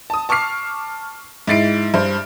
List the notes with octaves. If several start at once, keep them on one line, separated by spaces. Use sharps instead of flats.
A5 D#6
A5 C#6 D6 F6 C7
G#2 E4 A6 C7 D7
G2 C5